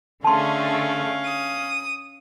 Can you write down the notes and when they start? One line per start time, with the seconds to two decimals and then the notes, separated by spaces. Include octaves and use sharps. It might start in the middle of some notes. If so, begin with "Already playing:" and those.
0.24 D3 A3 C#4 G#4 F5 A5 C6
1.24 D#6